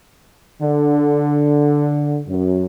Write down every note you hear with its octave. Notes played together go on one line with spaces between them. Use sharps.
D3
F#2